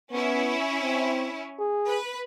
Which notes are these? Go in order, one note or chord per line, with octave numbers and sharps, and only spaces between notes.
B3 C#4 E4
C4
G#4
B4